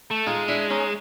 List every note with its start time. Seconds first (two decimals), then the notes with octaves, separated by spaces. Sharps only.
0.11 A3
0.27 G#3 D#4 F4
0.48 D4 E4
0.70 C#4 D#4